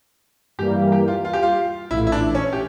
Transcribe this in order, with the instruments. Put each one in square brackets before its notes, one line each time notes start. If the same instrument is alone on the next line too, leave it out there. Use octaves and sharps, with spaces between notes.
[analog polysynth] G2 E3 G3 A#3 [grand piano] G4
[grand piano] G4
F4
F4
G4
F4
[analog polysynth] A#1 A2 E3 [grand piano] E4
[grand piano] E4
D4
C#4
G4